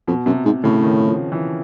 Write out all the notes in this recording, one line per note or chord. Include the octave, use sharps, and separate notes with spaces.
F2 B2
F#2 C3
G#2 C3
A2 C#3
D#3
F3
E3